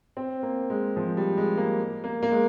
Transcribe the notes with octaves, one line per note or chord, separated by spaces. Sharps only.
C4
A#3
G#3
F3
G3
G#3
A#3
A#3
A#3
G#3